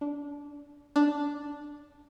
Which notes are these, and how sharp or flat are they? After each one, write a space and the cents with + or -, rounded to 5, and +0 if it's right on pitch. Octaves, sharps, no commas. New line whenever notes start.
D4 -20
D4 -5